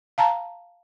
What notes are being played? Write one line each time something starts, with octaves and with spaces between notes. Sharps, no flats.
F5 A5 A#5